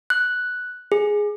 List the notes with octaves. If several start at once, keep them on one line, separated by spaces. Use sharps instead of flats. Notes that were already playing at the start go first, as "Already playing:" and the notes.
F#6
G#4